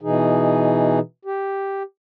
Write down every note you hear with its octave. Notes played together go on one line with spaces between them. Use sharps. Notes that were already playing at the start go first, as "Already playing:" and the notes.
B2 E3 D#4 G#4
G4